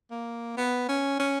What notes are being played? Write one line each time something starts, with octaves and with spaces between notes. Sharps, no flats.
A#3
B3
C#4
C#4